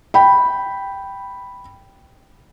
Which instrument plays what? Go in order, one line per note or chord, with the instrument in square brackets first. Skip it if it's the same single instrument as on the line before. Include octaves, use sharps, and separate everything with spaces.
[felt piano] G5 B5